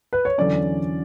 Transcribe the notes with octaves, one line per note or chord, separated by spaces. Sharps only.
B4
C#5
E2 D3 F#3 C#4 D5